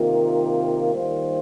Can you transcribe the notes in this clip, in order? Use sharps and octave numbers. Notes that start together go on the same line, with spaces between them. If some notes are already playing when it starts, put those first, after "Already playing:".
Already playing: C3 D#3 A#3 F4 A#4
D#3 G3 A#3 F4 C5